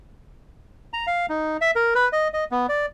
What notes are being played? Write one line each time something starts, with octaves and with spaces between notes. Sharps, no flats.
A#5
F5
D#4
E5
A#4
B4
D#5
D#5
B3
D5